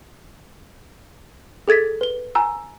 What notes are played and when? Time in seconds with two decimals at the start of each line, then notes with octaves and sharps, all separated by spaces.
1.68 G#4 A4 G#6 A6 B6
2.01 B4 G7
2.35 G#5 A#5 E6